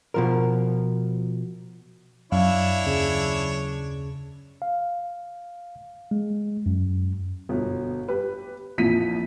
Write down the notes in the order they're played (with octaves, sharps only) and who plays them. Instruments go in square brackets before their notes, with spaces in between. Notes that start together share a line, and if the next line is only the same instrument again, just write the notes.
[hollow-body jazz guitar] B2 F3 A#4
[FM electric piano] F#2 [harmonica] D4 E4 C#5 [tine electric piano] F5
[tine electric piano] D#2 C#3
F5
G#3
F#2
[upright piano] G1 B2
G4 B4
A#1 F2 E3 F3 B6 D#7